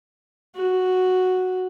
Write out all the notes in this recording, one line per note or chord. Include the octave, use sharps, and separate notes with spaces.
F#4